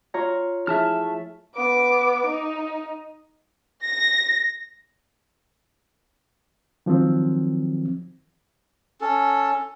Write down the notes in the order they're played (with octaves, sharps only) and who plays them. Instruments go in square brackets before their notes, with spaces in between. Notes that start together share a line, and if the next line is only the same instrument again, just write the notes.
[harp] F4 C#5 A#5
[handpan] F3 E4 G#4 [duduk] A3 [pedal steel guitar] E5 A5 F6
[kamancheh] B3 D6
D#4
[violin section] A#6
[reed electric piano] D#3 F3 F#3 C4
[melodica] C#4 A4